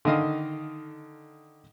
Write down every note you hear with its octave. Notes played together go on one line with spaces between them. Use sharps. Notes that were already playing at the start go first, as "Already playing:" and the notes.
D3 D#3 D#5 F5 D#6